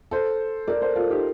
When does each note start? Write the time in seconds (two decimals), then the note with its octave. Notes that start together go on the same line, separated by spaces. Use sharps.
0.11 A4 C5
0.68 A#4 D5
0.82 A4 C5
0.96 F4 A4
1.10 D#4 G4